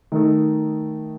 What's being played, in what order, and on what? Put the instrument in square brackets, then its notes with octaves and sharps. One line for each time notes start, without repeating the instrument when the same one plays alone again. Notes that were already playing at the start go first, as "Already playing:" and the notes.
[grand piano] D#3 A3 D#4 A4